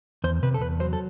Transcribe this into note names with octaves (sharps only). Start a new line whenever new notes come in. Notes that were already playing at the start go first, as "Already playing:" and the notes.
E2 C5
C3 B4
A4
E2 B4
F#3 C5
A4